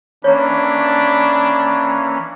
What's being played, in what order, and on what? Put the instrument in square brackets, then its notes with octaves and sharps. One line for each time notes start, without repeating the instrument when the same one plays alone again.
[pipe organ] E3 A#3 C#4 [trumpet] D4 [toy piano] C#5 A#5 [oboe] B5